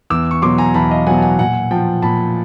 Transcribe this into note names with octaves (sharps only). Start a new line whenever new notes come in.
E2 D6 E6
C#6
B2 F#3 C6 D6
G#5 A#5
E2 A5 B5
D#5 F5
B2 F#3 F#5 G#5
A5
F#5 G#5
A#2 F#5 G#5
F3 G5 A5
A#2 A5 B5